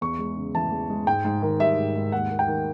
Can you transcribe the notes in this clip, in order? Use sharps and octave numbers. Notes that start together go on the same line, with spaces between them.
E2 C#6
G#3
C#3
E3 A5
E2
G#3
G#2 G5
G#2
D#3
G3 E5
G#2
G#2
D#2 F#5
A#3
G5
D#3